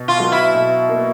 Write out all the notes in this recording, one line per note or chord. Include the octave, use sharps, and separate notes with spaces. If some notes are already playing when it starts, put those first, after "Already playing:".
Already playing: B2
F4
F#3
E4
B2
A#3